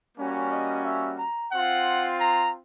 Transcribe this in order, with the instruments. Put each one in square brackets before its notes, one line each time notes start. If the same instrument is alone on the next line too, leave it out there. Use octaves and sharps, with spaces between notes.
[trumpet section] G3 A#3 C#4 F#4
D#5
E5
A#5
C4 F4 F#5
A#5